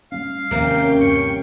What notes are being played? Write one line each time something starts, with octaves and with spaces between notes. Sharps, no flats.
G3 G#3 C#4 F5
D#2 C3 D#3 F3 A#3 C#4 G5
G2 C#6